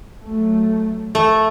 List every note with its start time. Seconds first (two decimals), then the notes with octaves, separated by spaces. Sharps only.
0.23 F#3 A3
1.15 F2 A3